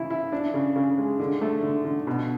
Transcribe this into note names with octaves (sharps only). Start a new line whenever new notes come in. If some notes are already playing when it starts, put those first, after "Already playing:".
Already playing: C#3 E3 E4
E4
D4
C#3
C#3
G#3
D3
A3
D3
D3
B2